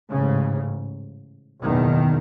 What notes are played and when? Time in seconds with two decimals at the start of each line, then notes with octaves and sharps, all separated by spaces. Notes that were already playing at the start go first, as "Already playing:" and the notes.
0.12 A1 G#2 C#3
1.62 F#1 E2 B2 D#3